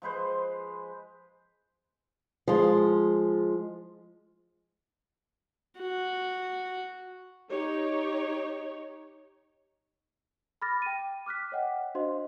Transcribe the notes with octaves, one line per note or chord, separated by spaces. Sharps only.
F3 G#3 B4 C5
F3 G#3
F#4
D#4 G4 C#5
B5 D6 F6 A6 A#6
G5 D#7
D6 F6 F#6 B6
C#5 D#5 F#5 G5
D4 F#4 C5 D#5 F5 C6